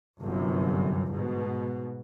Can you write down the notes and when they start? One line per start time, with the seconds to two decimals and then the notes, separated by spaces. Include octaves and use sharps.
0.21 G1 C2 F#2 C3
1.12 G#2 B2